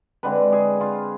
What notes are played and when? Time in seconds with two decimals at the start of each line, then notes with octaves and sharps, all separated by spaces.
0.23 D3 G#3 C4 B4
0.52 G#4
0.81 F4